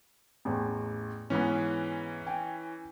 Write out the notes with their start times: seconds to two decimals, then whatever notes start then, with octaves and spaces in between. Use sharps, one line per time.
0.45 A1 E2
1.30 G#2 E3 G#3 B3 C#4
2.26 G5 G#5